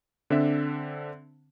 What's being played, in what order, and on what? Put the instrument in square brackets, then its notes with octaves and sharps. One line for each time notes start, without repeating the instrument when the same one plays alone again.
[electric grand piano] D3 C4 D4 E5